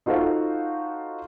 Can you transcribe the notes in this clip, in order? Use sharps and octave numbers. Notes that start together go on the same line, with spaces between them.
D#4 F4 F#4 A4 C5 F5